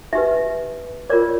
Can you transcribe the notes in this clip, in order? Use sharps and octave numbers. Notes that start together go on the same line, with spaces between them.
D#4 G4 B4 E5
F4 A#4 C#5 D5